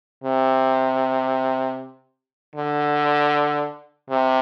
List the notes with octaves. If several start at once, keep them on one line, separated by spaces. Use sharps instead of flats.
C3
D3
C3